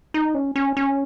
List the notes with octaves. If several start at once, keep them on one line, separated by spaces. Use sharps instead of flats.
D#4
C#4
C#4
C#4